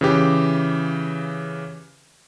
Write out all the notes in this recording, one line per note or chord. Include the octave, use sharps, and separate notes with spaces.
C#3 E3 G4